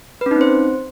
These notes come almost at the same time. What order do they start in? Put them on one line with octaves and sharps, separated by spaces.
B4 C#4 D#4 C4 C5